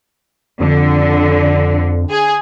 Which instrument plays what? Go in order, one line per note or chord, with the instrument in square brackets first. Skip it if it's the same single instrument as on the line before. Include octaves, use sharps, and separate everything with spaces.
[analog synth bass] F2 [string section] D3
[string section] G#4